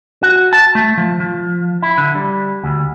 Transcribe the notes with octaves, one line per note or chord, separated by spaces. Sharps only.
F#4
A5
A3
F3
F3
E4
D3
G3
D2